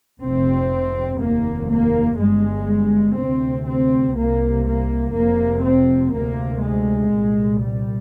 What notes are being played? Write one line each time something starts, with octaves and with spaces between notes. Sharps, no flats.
F1 F2 C3 C4
F1 D#2 A#3
A#3
G1 G2 G#3
D2 C3 C4
C4
C2 C3 A#3
A#3
F1 F2 C3 A#3
C4
D2 C3 A#3
G#3
C2 A#2
G3